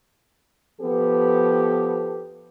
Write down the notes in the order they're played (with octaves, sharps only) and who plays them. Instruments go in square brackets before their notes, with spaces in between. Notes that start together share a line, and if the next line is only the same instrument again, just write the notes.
[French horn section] F3 B3 G4 A4 B4